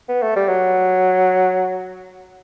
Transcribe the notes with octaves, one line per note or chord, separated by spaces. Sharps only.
B3
A3
G3
F#3